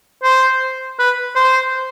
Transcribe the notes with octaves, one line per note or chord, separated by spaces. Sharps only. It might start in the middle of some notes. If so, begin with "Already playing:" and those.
C5
B4
C5